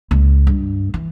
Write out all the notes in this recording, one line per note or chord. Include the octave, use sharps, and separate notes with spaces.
C#2
G2
E3